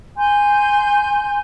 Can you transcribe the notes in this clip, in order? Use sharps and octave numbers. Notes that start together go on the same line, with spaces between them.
G#5 C6 G6